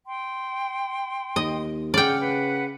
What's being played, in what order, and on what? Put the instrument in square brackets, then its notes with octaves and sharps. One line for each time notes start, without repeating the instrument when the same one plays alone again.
[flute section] G5 C6
[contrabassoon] D#2 [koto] D#5
[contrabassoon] C#3 [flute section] G#4 F#5 F6 [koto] D5 G5
[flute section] B4 F#5